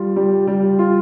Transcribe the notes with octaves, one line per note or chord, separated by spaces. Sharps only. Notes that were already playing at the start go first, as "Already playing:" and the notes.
Already playing: G3 F4
G3
G3
F4